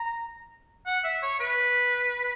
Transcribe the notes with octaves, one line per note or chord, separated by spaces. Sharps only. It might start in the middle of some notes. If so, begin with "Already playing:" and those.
Already playing: A#5
F#5
E5
C#5
B4